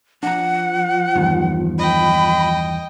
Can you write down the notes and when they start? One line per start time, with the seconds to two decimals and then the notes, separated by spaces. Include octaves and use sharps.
0.23 F3 D4 F#5 A#5
1.16 E2 G2 D#3
1.79 D#5 G5 B5